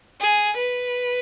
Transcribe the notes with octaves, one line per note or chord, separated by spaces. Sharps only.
G#4
B4